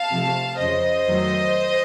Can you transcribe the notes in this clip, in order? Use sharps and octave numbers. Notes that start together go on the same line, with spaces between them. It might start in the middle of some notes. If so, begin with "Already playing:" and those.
Already playing: F5 A5
C3 F3 A3
F2 C#3 F3 C5 D#5
F2 D#3 F#3 A3